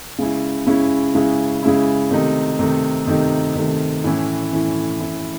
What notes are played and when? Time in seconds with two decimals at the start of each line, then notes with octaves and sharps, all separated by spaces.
0.18 C#3 G#3 C#4 E4
0.67 C#3 G#3 C#4 E4
1.15 C#3 G#3 C#4 E4
1.63 C#3 G#3 C#4 E4
2.11 C3 D#3 A3 D#4
2.59 C3 D#3 A3 D#4
3.07 C3 D#3 A3 D#4
3.55 C3 D#3 A3 D#4
4.04 A2 E3 A3 C#4 E4
4.52 A2 E3 A3 C#4 E4
5.00 A2 E3 A3 C#4 E4